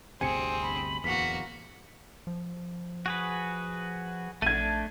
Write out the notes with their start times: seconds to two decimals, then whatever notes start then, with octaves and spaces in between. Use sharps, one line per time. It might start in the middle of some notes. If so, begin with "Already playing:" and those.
0.21 G1 D2 C3 C4 G#4 G#5 C#7
0.62 B5
1.04 D1 G1 E2 A#3 F#4 B6
2.27 F3
3.06 F#4 G#4 B4
4.42 A#1 A3 D4 G#6 D#7